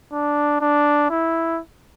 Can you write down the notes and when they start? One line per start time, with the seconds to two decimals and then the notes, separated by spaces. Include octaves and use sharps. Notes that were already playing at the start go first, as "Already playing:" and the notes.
0.13 D4
0.61 D4
1.10 E4